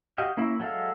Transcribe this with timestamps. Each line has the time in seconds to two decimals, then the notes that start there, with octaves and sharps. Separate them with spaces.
0.18 F#4 G4 D#5 F5
0.37 A#3 C#4 E4 E5
0.60 F#3 G#3 A4 E5 F5